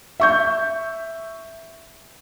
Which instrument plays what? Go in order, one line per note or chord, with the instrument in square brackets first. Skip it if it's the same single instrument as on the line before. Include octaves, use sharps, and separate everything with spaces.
[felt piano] E5 C#6 G6